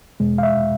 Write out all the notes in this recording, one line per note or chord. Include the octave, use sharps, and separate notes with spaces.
E2 B2 G#3
F5
E5